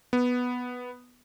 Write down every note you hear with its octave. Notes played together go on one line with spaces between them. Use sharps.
B3